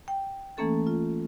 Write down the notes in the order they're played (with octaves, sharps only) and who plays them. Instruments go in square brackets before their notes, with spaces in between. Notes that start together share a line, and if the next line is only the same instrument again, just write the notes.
[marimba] G5
E3 A3 A#3 C#4 A4 A6
F4